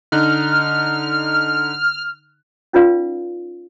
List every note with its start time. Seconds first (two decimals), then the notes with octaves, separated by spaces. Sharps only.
0.12 D3 D#4 F6 F#6
2.73 C#4 D#4 F4 B4 D5 F5